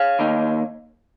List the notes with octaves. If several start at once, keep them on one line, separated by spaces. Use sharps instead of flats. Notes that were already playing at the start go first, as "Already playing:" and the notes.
Already playing: C#5 F5
D#2 D#3 A#3 D#4